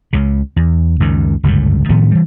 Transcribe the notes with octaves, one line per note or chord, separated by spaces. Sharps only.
C#2 C#3
E2
C#2 F#2 D#3
G1 C#2 F#2 A2
A2 D#3 F3 B3
E3 G3